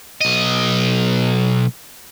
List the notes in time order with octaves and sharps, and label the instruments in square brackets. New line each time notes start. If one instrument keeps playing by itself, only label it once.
[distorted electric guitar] B1 D#5